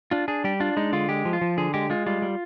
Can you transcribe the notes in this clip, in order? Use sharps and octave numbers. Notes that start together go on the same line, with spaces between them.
D4 F4
D4 G#4
G3 G4
D4 F4
G#3 D#4
D3 F4
G#3 G4
F3
F4
F3
D3 G#4
G#3 G4
G#3 F4
G3 F4
G3